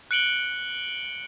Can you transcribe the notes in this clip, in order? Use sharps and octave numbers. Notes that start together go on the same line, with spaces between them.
F#6 C#7 D7 F#7 G7